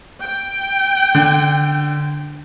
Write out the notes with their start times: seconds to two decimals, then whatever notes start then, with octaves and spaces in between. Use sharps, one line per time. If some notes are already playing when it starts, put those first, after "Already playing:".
0.23 G5
1.15 D3